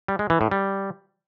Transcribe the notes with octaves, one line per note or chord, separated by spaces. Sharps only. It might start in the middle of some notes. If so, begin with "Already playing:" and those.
G3
G#3
E3
A2
G3